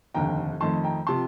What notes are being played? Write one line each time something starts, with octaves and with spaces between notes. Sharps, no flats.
F1 D#2 D3 G5 A#5
F2 D#3 A3 A5 C6
G5 A#5
C3 F3 A5 C6